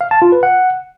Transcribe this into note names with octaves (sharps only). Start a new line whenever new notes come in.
F5
A5
F4
B4
F#5